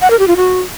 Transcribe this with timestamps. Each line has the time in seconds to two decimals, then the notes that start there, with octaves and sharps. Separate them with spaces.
0.02 F#5
0.10 A#4
0.19 G4
0.28 F4
0.37 F#4